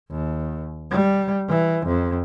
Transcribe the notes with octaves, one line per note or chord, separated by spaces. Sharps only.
D#2
G3
E3
F2